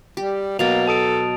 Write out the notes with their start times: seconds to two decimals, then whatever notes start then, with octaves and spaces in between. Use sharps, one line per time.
0.17 G3 G4
0.59 B2 F#3 A#3 A6 F7
0.87 A4 A5 D#6 D7